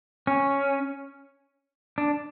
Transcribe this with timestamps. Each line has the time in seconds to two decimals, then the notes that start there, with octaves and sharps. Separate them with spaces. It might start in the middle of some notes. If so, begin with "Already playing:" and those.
0.27 C#4
1.98 D4